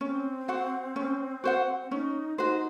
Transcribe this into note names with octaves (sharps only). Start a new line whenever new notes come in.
C4 C#4
F#4 C5 F#5
C#4
F#4 C5 F#5
C#4 D#4
D#4 F#4 C5